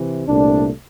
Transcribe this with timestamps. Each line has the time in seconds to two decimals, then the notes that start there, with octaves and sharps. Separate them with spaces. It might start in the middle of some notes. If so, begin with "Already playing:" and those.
Already playing: C3 E3
0.27 C2 A#2 A3 D4